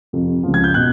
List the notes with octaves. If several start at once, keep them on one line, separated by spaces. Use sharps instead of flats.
F2 C3 F3
C#2 C#3 F3
G#6
G6
B2 F#6